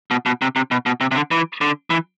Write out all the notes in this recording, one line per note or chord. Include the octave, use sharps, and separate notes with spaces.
B2
B2
C3
C3
B2
B2
C3
C3
D3
E3
D3
E3